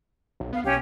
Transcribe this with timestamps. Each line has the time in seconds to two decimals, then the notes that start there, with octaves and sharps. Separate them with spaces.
0.40 B1
0.53 B3 F5
0.64 B1 C#4 G4 C#5